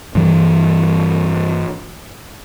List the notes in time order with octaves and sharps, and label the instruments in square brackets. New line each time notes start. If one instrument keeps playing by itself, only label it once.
[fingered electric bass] G2 E3 G3